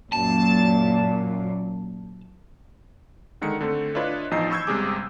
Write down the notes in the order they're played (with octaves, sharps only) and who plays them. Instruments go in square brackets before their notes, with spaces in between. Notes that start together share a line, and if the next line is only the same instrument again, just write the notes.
[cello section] F#2 A#2 [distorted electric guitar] A5
[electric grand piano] D3 D#3 G#3 C#7
D3 A3 C4
D4 E4 F4 B4 C#5 D#5
A1 E2 F3 D#4 D#5 C7
B5 C#6 E6 G6 G#6
G1 C3 G3 G#3 G#4 D6